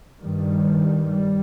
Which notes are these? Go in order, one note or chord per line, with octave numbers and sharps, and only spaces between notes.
G2 D#3 G3
G3